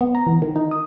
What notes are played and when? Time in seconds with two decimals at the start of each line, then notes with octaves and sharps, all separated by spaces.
0.01 B3
0.15 A#5
0.27 E3
0.42 D#3
0.56 D#4
0.71 D#6